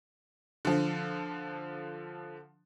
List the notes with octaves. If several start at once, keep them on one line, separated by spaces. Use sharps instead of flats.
D3 F3